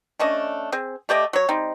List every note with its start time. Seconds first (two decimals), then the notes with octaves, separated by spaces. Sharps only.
0.19 A3 C#4 D4 D#5
0.72 C4 G#4
1.09 A3 G4 D5 D#5
1.33 F#3 C#5
1.48 G3 C4 D#4